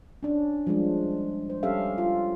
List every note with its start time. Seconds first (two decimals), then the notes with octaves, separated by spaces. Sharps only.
0.23 C#4 D4
0.67 F3 G3 G#3 D4
1.50 C5
1.63 G3 C#4 G4 A4 E5 F5
1.98 F4